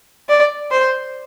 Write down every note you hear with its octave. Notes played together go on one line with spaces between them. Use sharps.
D5
C5